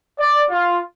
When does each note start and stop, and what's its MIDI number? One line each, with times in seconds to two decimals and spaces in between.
0.20 0.43 74
0.49 0.79 65